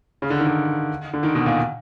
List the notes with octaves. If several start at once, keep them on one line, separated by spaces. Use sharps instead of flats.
C#3
D3
D#3
D3
D3
D#3
B2
A#2